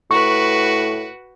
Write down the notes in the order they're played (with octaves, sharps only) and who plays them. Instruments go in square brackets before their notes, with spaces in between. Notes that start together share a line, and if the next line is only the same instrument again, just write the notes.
[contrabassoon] A2 [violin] F#4 B4 [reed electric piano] C#6